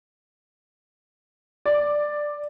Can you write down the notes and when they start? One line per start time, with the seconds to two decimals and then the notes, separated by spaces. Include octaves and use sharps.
1.66 D5